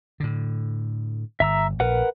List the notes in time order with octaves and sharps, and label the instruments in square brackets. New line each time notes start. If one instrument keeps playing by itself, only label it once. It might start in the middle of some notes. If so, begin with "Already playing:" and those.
[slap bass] A2 D3
[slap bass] G1 [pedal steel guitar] E5 A#5 E6
[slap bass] A#1 [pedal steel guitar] A#4 B4 F#5